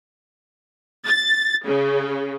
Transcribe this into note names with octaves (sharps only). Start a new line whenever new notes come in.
A6
C#3